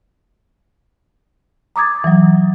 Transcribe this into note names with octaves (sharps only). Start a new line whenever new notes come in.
A#5 D6 D#6 G#6 A6
E3 F#3